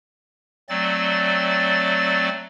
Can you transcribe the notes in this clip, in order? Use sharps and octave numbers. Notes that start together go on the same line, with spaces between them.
F#3 A3 C4 D5 A6